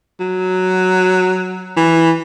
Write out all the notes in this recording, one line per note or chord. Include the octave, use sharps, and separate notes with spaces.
F#3
E3